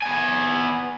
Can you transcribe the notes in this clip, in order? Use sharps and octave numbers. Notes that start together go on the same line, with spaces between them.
B3 G#5